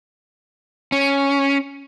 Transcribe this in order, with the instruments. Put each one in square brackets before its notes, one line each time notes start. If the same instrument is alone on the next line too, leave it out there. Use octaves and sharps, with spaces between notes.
[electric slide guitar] C#4